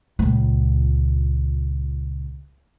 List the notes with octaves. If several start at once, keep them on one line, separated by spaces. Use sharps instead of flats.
C#2 A#2